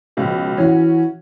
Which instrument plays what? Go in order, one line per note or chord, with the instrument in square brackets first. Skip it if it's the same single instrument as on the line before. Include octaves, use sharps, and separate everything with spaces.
[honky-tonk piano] C#2 B2 F3
[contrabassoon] E3 [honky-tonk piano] C#4 F#4